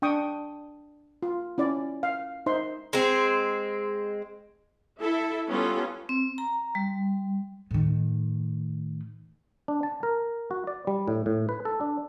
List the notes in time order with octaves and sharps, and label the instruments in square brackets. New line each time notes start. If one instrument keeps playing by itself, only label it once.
[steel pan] D4 G5 C#6 D#6
F4
C#4 E4 D5
F5
D#4 C5 E5 C6
[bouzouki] G#3 C4
[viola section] E4 A4 E5
G3 B3 C#4 F4 A4
[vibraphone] C4
A#5
G3
[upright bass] A2 D#3
[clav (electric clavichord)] D4
A5
A#4
F#4
D5
G3
A2
A2
B4
A4
D4